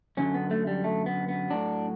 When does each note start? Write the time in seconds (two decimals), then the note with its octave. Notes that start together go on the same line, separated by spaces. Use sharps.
0.17 F#2 D3 F#3 C#4
0.34 B3
0.51 A3
0.67 G3
0.84 A3
1.06 B3
1.28 B3
1.50 A2 F#3 D4